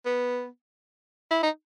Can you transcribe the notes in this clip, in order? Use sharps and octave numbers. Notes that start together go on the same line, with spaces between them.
B3
E4
D#4